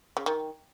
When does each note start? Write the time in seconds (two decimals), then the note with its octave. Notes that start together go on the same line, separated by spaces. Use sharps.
0.17 C#3
0.26 D#3